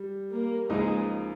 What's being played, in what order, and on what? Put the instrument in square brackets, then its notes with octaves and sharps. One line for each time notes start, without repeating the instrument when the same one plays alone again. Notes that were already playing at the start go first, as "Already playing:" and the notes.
Already playing: [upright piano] G3
[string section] A#3
[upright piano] C#2 C#3 F3 A#3 D#4 [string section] G#3